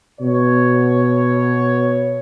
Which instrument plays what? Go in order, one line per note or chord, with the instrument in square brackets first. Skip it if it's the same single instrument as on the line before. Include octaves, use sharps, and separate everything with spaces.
[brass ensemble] B2 C#5